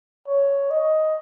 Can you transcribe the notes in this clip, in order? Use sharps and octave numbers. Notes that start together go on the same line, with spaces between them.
C#5
D#5